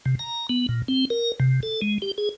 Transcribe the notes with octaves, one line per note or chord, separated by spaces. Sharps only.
C3
A#5
B3
A#2
C4
A#4
C3
A4
G#3
G4
G#4